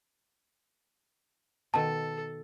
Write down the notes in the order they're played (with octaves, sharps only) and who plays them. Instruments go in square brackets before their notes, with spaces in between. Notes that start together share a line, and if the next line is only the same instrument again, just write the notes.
[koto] B2 D#3 [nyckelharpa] A4 [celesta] A5